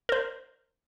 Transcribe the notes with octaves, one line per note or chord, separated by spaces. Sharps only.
A#4 C5